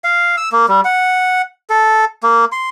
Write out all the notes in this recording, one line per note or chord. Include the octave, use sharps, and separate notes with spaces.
F5
E6
A#3
G3
F#5
A4
A#3
C6